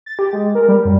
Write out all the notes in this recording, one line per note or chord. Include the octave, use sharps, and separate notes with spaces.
A6
G4
G#3
A#4
G3
F#2